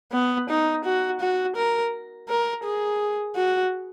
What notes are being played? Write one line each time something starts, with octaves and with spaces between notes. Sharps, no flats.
B3
D#4
F#4
F#4
A#4
A#4
G#4
F#4